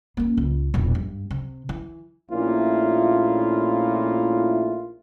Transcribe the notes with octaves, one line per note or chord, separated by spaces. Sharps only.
A#3 C#4
C#2
E1 A#1
G2
C3
E3
A#1 A#2 A3 C#4 E4 F4